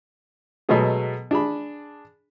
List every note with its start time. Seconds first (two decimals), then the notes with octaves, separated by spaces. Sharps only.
0.69 B2 F#3 G#3 A3 B3 G#4
1.31 D4 G#4 B5